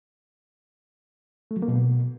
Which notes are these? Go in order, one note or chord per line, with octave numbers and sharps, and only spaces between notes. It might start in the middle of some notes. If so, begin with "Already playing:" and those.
A3
F#3
A#3
B2